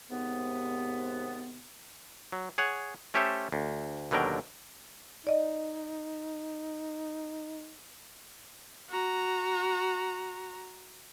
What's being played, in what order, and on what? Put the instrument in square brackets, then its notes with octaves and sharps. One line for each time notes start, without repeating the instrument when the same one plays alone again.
[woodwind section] D#2 G#2 C3 B3
[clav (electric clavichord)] F#3
G#4 C#5 F#5
A3 C#4 G4 A4 C5 E5
D2
D#2 B2 D3 F#3 A#4 G5
[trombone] D#4 [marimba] D5 D#5
[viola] F#4 A#5